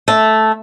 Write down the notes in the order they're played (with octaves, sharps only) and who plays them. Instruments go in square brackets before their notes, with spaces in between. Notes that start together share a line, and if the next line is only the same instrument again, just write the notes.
[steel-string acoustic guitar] A3